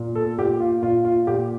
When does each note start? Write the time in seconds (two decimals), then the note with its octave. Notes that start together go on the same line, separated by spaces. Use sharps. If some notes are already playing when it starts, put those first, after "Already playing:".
Already playing: A#2
0.15 A4
0.38 A#2 G4
0.60 F4
0.82 A#2 F4
1.05 F4
1.27 A#2 G4